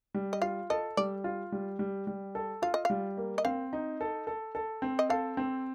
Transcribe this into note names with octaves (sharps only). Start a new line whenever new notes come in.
G3
D#5
F4 F5
A4 D#5
G3 D5
F4
G3
G3
G3
A4
F4 F5
D#5
G3 F5
A#3
D#5
C4 F5
D#4
A4
A4
A4
C4
D#5
A4 F5
C4